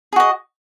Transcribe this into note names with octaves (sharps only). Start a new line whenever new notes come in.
F#4 G#4 D#5